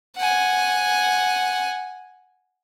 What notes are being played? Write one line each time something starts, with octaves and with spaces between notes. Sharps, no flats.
F#5 G#5